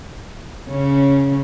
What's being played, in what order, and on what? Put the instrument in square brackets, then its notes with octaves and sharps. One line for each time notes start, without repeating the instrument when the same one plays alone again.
[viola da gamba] C#3 C#4